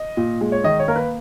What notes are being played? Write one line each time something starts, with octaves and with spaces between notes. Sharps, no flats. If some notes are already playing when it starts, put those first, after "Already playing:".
Already playing: D#5
A#2
G#3
C#5
D#3 D#5
C#5
A#3 A#4
B4